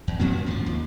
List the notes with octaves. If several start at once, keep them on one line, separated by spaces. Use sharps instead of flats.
E2
F#2 F3 A#3 C4
C#4
G#1 D2 D3 F3
D#2